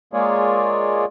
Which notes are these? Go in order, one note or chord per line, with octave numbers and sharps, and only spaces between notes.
G#3 A#3 F4 G#4 C#5 D5